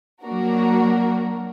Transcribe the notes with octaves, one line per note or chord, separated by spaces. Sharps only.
F#3 A#3 D4 F#4 A#4